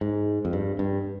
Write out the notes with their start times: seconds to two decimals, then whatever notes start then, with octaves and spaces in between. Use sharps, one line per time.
0.01 G#2
0.45 F2
0.53 G2
0.79 G2